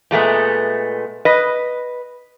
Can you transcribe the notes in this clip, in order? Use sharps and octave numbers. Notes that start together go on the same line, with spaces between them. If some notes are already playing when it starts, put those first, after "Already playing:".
A#2 G#3 A3 B3
B4 D#5